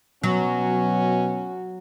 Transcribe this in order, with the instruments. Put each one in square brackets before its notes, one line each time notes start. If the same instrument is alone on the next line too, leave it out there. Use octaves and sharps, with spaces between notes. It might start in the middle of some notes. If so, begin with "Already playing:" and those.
[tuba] B2 [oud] F#3 [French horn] C#4 [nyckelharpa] F#4